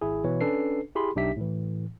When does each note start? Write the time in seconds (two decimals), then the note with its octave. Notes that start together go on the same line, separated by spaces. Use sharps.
0.01 G#1 E4 G#4
0.24 B2 E3 C#5
0.41 C#4 D4 A4 B4 C7
0.95 E4 G4 G#4 B5 C6
1.16 B1 D4 D#4 G4 E5 B6
1.37 A2 E3